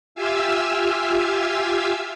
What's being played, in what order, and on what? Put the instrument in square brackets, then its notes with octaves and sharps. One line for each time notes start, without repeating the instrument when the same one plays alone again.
[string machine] F4 G4 E5 F5 G#5 E6